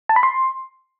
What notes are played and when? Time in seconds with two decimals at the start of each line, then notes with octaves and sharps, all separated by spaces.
0.09 A5
0.16 B5
0.23 C6